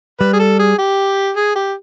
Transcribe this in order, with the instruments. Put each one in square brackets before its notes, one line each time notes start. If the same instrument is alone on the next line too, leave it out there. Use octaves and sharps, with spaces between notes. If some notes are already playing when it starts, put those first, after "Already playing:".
[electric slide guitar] G3 [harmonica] B4
[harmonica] G#4
A4
G#4
G4
G#4
G4